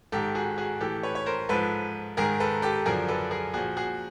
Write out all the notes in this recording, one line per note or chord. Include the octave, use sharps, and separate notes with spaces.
G#2 D#3 G4 A4
F#4 G#4
F#4 G#4
A2 E3 G4 A4
B4 C#5
C#5
A#4 C5
G#2 F3 A4 B4
G#2 D#3 G#4 A#4
A4 B4
G4 A4
F#2 D3 F3 G#4 A#4
A4 B4
G#4 A#4
A#2 F3 F#4 G#4
F#4 G#4